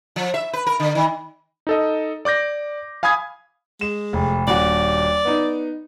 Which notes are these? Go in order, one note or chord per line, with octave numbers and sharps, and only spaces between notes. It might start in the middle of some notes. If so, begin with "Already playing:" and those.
F3
E5
B4
A#4
D3
D#3
D#4 A4 D#5
D5 D6 G6 A#6
F5 G#5 B5 D#6 G#6
G#3 E7
F1
D#1 D4 F#4 D5
B3 D#4